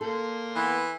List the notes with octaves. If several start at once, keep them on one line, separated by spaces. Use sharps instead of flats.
A#3 A4 C6
E3 B3